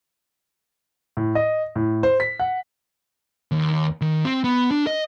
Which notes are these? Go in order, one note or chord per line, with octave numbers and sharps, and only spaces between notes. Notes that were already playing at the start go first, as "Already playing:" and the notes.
A2
D#5
A2
C5
B6
F#5
D#2
D#3
C4
B3
D4
D#5